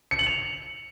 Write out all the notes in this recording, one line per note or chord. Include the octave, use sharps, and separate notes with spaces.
C#7
F#7
F7